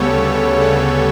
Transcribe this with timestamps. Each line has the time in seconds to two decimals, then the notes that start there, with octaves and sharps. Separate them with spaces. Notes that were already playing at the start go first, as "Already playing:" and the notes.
Already playing: D2 C#3 G3 B3 A4 C#5
0.25 D2
0.59 C#3 G3 B3